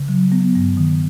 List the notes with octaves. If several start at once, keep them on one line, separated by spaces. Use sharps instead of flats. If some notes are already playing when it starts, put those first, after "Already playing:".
Already playing: C#3
F#3
B3
G2
D#3